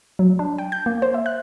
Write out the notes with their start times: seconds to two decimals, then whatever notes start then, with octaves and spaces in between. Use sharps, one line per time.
0.19 F#3
0.39 D4
0.58 G5
0.72 G6
0.86 A#3
1.02 C5
1.14 E5
1.26 F#6